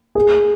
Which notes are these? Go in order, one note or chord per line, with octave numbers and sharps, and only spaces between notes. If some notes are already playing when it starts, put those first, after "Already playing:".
G#4